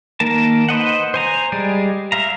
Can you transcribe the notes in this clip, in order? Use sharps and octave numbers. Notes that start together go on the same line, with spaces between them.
D#3 A#3 A#4 A5
B4 C5 D#5 F#5
C5 G#5 A#5
G3 G#3 G#4 D5
E5 F5 A#5